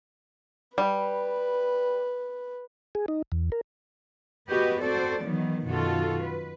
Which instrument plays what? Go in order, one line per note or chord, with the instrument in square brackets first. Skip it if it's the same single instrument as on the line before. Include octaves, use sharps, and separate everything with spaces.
[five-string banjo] G3 [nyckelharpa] B4
[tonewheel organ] G#4
D#4
E2
A#4
[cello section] B3 F#4 G4 B4 D#5
C4 F#4 A4 C5 D5
D#3 E3 F#3 B3
F#2 B2 D#3 F4 F#4 A4
B4